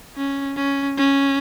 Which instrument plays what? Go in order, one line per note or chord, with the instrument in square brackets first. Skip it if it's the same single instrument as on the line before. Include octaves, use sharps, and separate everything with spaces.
[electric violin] C#4
C#4
C#4